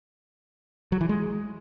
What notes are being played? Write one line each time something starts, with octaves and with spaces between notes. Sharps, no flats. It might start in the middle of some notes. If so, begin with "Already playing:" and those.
F#3
E3
G#3